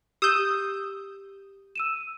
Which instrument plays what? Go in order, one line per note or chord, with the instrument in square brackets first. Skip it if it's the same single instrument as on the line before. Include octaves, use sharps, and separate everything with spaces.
[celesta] G4 E6 E7 [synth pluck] D#6 G6
[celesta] E6 D#7 E7